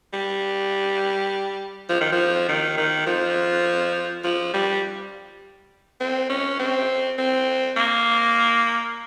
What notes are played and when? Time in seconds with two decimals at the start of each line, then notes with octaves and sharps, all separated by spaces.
0.13 G3
1.89 F3
2.01 D#3
2.12 F3
2.49 D#3
2.78 D#3
3.07 F3
4.24 F3
4.54 G3
6.01 C4
6.30 C#4
6.59 C4
7.18 C4
7.77 A#3